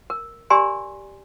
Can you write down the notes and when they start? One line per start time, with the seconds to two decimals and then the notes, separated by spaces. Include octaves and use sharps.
0.10 A#4
0.50 G4 A#4 D5 G#5 A#5 C6